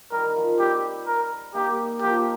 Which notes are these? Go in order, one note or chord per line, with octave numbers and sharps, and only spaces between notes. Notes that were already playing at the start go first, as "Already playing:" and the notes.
D#3 G3 A#4
D#3
F3
F3
G3 C4 G4
A#4
A#3 D#4 G4
F3 A#3 G4